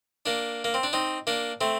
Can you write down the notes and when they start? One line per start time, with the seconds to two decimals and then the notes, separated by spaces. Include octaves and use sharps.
0.26 A#3 D4
0.64 A#3
0.74 C4
0.83 D4
0.93 C4 D#4
1.27 A#3 D4
1.61 A3 C4